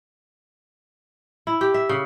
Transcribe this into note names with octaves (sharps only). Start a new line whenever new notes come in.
E4
G4
E5
C#3